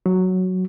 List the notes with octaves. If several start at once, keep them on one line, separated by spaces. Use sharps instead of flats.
F#3